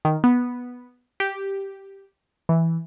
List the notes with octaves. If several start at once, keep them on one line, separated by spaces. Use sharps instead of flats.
D#3
B3
G4
E3